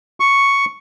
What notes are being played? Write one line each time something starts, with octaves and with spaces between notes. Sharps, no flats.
C#6